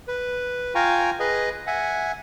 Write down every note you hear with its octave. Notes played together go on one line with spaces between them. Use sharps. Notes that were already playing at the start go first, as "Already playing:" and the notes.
B4
F4 F5 G5 G#5 A#5 C#6
G#4 B4 D#5
E5 F#5 G#5